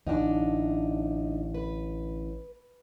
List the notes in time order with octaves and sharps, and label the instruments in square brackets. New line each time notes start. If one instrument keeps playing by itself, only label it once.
[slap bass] A1 A2 D3 [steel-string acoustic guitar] D4 D#4
[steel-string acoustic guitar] B4